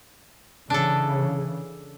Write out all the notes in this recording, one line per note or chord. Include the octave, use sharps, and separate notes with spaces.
C#3 E3 D4 A4